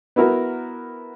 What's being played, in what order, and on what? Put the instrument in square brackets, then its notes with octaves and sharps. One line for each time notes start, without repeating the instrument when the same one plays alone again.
[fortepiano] B3 E4 F#4 A#4